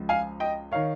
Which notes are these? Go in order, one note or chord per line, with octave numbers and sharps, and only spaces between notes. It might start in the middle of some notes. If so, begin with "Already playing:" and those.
Already playing: C#2 F3
F5 G#5
D#5 G5
D#3 C#5 F5